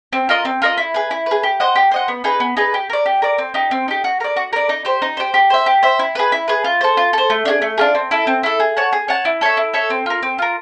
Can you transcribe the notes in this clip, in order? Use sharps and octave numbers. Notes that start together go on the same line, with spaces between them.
C4
F4 A#4 D#5
C4
F4 A#4 D#5
E4
G#4 B4
E4
G#4 B4
G4
C5 D#5 F#5
G4
C5 D#5 F#5
B3
D#4 G#4 B4
B3
D#4 G#4 B4
G4
A#4 D5
G4
A#4 D5
C4
D#4 G4
C4
D#4 G4
F#4
A#4 D5
F#4
A#4 D5
D#4
G4 C5
D#4
G4 C5
G4
C5 E5
G4
C5 E5
E4
G#4 B4
E4
G#4 B4
F4
A4 C5
F4
A4 C5
A3
D4 F4 G#4
A3
D4 F4 G#4
C4
E4 A4
C4
E4 A4
G#4
C#5 F#5 A5
G#4
C#5 F#5 A5
E4
A4 C#5 E5
E4
A4 C#5 E5
C4
F4 A#4
C4
F4 A#4